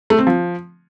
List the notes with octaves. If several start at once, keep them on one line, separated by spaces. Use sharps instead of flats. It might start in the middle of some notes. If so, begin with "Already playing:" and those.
A3
C4
F3